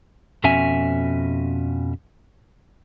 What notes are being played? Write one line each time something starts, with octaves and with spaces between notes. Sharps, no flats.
F2 B2 C#4 F#4 E5 G#5